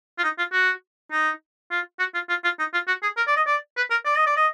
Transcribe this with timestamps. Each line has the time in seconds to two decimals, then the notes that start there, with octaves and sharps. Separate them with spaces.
0.19 F4
0.24 D#4
0.38 F4
0.53 F#4
1.12 D#4
1.71 F4
1.99 F#4
2.14 F4
2.29 F4
2.44 F4
2.59 D#4
2.74 F4
2.88 F#4
3.03 G#4
3.17 A#4
3.27 D5
3.37 D#5
3.47 D5
3.77 B4
3.91 A#4
4.05 D5
4.17 D#5
4.26 D5
4.37 D#5